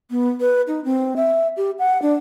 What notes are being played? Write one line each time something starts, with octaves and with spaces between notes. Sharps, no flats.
B3
B4
D#4
C4
E5
G4
F#5
D4